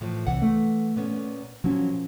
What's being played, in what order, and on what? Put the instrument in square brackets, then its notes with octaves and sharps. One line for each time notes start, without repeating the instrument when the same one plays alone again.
[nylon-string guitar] A2 E3 F3
[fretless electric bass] C2 [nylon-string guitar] E3 F#5
[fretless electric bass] A3
[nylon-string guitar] A#2 B3 C#4
[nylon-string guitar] A#2 F#3 [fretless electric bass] F3 C#4